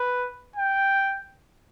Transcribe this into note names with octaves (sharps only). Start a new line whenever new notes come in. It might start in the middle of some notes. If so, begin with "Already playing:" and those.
Already playing: B4
G5